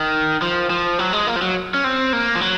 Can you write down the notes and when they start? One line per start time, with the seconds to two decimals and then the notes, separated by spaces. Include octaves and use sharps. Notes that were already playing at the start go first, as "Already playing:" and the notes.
Already playing: D#3
0.42 F3
0.70 F3
0.99 F#3
1.13 G#3
1.27 A#3
1.36 F3
1.42 F#3
1.74 C#4
1.84 C4
2.13 A#3
2.35 F3
2.41 F#3